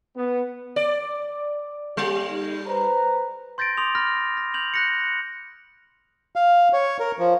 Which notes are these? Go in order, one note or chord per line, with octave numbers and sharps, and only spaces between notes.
B3
D5
G3 C#4 G4 A4
D#4
B4 C5 A#5
C6 G6 A6 A#6 D7
C6 D6 D#6 F7
B5 F6 A#6
A#6
G6 F7 F#7
F#6 A#6 C#7
F5
C#5
A#4
F3